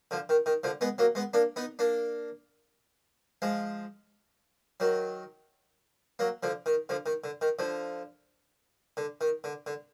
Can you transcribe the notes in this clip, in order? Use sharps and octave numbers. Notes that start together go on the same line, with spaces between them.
D3 F3
D#3
D#3
D3 F3
G#3 B3
F#3 A#3
G#3 B3
A#3 D4
B3 D#4
A#3 D4
F3 G#3
D#3 F#3
F#3 A#3
D3 F3
D#3
D3 F3
D#3
D3
D#3
D3 F3
D3
D#3
D3
D3